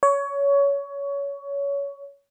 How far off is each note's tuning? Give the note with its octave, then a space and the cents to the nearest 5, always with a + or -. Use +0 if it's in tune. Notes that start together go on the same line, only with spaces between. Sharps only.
C#5 +20